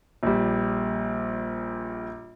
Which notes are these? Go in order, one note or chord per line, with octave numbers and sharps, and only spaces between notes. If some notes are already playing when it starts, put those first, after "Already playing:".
A#1 G3